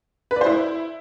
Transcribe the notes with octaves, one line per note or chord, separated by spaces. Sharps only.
B4
D5
C5
E4